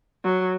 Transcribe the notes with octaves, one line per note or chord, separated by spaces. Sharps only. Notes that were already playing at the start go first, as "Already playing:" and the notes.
F#3